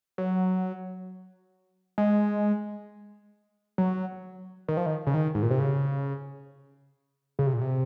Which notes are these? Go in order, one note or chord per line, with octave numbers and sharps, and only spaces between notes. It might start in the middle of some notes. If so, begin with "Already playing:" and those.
F#3
G#3
F#3
D#3
F3
D#3
C#3
D#3
G#2
A#2
C3
C#3
C#3
C3
A#2
C3